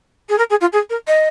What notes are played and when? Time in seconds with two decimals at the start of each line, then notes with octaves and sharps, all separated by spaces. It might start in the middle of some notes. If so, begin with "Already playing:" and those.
0.29 G#4
0.38 A#4
0.50 G#4
0.61 F4
0.72 G#4
0.90 A#4
1.07 D#5